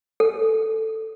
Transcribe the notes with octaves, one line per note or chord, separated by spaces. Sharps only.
A4